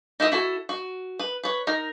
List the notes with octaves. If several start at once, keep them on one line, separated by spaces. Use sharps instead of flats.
D#4 E4 A#4 B4 D#5
E4 F#4 A4
F#4
B4
B4 C#5
D#4 A#4